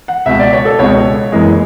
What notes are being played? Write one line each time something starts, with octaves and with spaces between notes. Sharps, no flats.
F#5
C#2 B2 G#3 E5
D5
C#5
A4
C#2 B2 G#3 C#5
F#1 F#2 E3 G#3